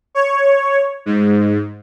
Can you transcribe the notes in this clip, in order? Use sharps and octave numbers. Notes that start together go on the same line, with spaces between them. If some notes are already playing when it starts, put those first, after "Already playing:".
C#5
G#2